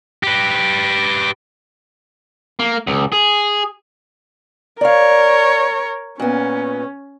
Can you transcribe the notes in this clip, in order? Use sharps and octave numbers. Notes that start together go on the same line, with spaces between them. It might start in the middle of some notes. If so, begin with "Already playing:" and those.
G4 B4
A#3
C#2
G#4
A#4 C#5 D5 F5
A#2 B3 C#4